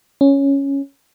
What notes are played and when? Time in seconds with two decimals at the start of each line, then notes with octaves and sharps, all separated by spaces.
0.21 C#4